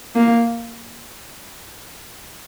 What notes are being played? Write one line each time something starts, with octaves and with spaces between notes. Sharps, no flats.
A#3